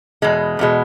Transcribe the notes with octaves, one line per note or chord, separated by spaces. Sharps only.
E2 B2 G#3
E2 B2 G#3